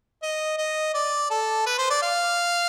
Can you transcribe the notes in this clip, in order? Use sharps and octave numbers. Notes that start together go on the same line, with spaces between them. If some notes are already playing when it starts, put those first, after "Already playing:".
D#5
D#5
D5
A4
B4
C5
D5
F5